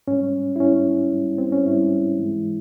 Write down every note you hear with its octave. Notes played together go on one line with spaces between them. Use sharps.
G#2 G3 C#4
E4
G#2 G3 C#4
G#2 G3
C4
C#4
G#2 G3 E4
G#2 E3 G#3